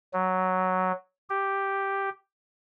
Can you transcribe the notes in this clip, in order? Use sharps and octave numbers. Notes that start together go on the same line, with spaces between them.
F#3
G4